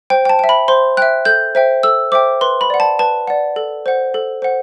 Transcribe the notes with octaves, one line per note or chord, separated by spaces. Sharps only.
C5 G5
G5
A5
E5 G5
B5
C5 C6
E5 G5 F#6
A4 G6
C5 E5 G5
A4 E6
C5 E5 G5 D6
B4 C6
B5
D5 F#5
A5
B4 A5
D5 F#5
A4
C5 F#5
A4
C5 F#5